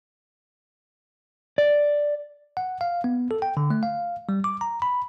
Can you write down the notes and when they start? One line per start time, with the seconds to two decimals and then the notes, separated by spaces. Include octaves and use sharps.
1.58 D5
2.57 F#5
2.81 F5
3.04 B3
3.31 A4
3.42 G5
3.57 D3
3.70 A3
3.83 F5
4.29 G3
4.44 D6
4.61 A#5
4.82 B5